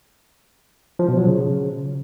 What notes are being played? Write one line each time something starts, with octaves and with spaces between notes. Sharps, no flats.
F3
B2
F#3
C#3